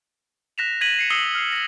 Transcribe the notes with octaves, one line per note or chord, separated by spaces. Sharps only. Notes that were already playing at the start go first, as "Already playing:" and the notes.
F#6 A#6 B6 E7 F7
G#6 A#6 B6 D#7 F#7
C7 C#7
D#6 E6 C7 C#7 F#7 G7
F6 C7
A#6 F#7